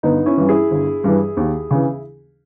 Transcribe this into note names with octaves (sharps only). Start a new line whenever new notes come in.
G1 B3 D#4
C#4 E4
G2 E3
E4 G#4
G1
G2 E3
D#2
C#3 E3